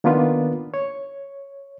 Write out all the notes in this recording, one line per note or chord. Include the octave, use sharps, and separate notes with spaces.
D#3 A#3 B3 D4 F4 B4
C#5